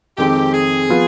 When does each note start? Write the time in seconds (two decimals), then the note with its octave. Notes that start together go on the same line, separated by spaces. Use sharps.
0.18 F2 D#3 G#3 C4 G4
0.54 G#4
0.89 F3 B3 F4 B4